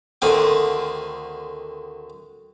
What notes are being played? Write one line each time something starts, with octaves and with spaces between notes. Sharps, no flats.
D2 D3 D#3 C4